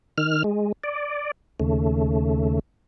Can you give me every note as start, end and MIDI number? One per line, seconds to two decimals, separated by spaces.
0.18 0.43 51
0.18 0.43 89
0.44 0.72 56
0.84 1.31 74
1.60 2.59 39
1.60 2.59 49
1.60 2.59 57